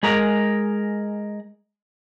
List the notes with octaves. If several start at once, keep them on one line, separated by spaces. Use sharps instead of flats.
G#3 G#4 A#4 A#5